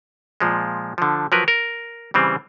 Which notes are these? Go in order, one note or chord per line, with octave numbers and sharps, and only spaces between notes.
A#2 F3 G#3
D3 F3
F3 F#3 A#4 B4
A#4
C#3 E3 G3 C4